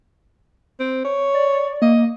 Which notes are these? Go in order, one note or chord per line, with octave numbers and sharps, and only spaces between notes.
C4
C#5
D5
A#3 D#5